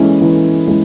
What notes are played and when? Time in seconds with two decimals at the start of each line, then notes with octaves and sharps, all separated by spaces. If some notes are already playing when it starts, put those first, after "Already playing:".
Already playing: E3 G#3 C#4 E4
0.21 E3
0.67 G#3 C#4 E4